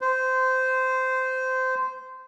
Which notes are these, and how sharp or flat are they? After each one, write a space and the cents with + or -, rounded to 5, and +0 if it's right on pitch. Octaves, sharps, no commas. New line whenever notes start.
C5 -15